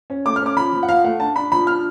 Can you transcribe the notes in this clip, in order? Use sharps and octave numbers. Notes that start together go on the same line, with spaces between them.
C#4
A3 D6
F6
C#4 D6
F3 B5
F3
F#5
F3 F5
A3 F#5
D4 A5
D4 B5
F3 B5
D4 F6